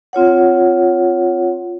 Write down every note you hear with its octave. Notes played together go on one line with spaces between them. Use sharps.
C4 F4 C#5 F#5